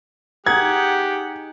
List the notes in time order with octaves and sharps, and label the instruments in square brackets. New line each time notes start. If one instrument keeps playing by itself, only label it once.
[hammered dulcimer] D#4 G#4 [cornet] G4 [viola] F#5 [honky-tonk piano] G#6